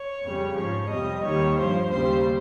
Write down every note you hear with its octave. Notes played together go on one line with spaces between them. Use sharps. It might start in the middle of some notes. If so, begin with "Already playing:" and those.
Already playing: C#5
F2 C#3 G3
G#2 F3 C#5
F2 C3 G3 D#5
D#2 D#3 G3 C#5
G2 F3 C5
D#2 C#3 G3 C5